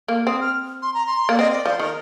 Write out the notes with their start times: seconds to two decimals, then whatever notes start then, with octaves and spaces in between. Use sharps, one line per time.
0.08 A#3
0.27 C4 D#6
0.41 F6
0.82 C6
0.94 A#5
1.06 C6
1.29 A#3
1.33 D5
1.38 C4 D#5
1.52 D5
1.66 F3 C5
1.79 D#3 A#4